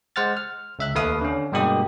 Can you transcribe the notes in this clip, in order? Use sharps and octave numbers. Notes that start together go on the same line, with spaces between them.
G#3 C5 F#5 F6 A6
F6
C#2 E5 F#6
D#2 A3 B4 F5 D#6
D3 C#4
G2 B2 G#3 A#3 G4 D#6